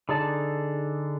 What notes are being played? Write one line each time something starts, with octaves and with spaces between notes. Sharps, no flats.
D3 D#4 G#4 D5 A5